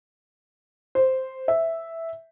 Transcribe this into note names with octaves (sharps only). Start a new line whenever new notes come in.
C5
E5